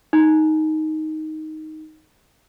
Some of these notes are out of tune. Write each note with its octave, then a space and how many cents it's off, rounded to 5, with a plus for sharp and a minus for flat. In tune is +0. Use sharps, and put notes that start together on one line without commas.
D#4 +5